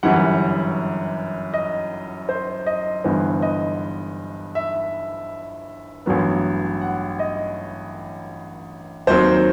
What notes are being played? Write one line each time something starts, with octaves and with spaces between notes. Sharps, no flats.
G1 F#2 E3 G3 F#5
D#5
C5
D#5
G1 G2 E3 B3 C5
D#5
E5
A1 G2 F#3 B3
F#5
D#5
D#2 D#3 F#3 C4 C5